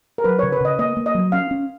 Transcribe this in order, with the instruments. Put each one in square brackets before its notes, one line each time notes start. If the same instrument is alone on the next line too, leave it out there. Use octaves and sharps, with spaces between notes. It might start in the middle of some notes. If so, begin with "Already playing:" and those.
[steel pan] A#4
[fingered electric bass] F#3 [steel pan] B4
[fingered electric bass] C#3 [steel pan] C#5
[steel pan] B4
[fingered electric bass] C#3 [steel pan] D#5
[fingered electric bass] A#3 [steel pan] D#5
[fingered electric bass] A#3
[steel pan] D#5
[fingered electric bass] F#3
[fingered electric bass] C#4 [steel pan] F5
[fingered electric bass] C#4